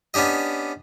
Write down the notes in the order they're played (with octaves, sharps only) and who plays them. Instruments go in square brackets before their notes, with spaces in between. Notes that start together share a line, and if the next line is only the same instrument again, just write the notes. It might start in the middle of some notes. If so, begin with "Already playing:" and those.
[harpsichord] B3 C#4 D4 G4 D#5